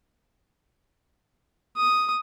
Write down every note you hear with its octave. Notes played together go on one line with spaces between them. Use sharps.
D#6